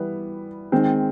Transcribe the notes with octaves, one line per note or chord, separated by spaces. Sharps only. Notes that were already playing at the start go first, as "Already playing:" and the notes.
Already playing: E3 G3 B3
D#3 G#3 C4